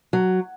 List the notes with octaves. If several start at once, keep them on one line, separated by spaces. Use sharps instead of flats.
F#3